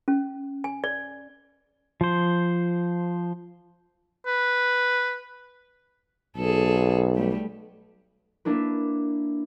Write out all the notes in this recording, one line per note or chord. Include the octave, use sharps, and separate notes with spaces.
C#4
G#5
D5
F3 C5
B4
B1 G#4 A4
G3 A3
A#3 D4 E4 B4